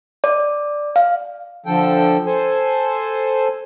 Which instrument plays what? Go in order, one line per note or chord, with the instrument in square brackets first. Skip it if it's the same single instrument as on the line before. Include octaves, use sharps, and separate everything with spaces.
[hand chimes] D5
F5
[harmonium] D3 F3 A4 G5
A4 C5 G#5